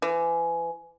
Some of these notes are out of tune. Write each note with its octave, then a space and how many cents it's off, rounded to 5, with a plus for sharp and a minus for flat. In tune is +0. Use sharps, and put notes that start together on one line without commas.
E3 +30